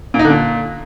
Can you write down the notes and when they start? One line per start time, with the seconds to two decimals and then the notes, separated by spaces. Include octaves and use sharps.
0.14 A#2
0.19 D#4
0.25 D3
0.30 A#2